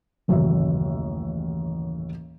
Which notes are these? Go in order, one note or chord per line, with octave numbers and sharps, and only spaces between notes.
D#1 A1 F#2 C#3 E5